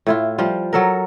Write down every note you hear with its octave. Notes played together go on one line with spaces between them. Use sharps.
A2 E4 F4
F3 G3 F4
F#3 A4 A#4